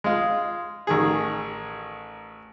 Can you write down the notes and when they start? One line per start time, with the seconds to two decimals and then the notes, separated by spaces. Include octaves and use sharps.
0.04 G#3 F4
0.87 A1 D#3 G#4